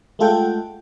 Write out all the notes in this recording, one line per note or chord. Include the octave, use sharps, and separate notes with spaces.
G#3 A3 F4 A4 F#5 G5